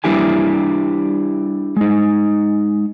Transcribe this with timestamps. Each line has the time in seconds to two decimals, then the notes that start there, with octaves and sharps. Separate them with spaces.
0.04 G3 D4 E4 G4 G#5
1.77 G#3 D#4